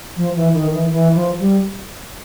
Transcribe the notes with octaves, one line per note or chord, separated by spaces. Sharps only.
F3
E3
D#3
E3
E3
F3
G3